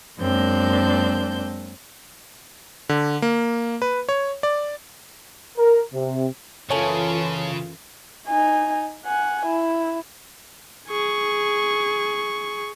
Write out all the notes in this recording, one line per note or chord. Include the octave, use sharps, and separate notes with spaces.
F#2 G#3 A#3 C4 D4 G6
D3
A#3
B4
C#5
D5
A#4
C3
F#2 C#3 E3 A3 F4 C#5 G#5 A5
D#4 G#5
F#5 G#5
E4
G#4 C#6